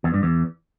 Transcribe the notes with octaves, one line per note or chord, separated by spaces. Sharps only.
E2
G2
E2